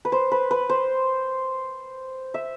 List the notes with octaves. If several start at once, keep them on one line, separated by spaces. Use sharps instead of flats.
B4
C5
B4
B4
C5
E5